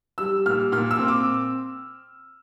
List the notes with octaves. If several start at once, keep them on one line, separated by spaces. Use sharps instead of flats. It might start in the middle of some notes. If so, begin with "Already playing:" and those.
G3 E6
A#2 F6
A#2 F6
E6
C4
D6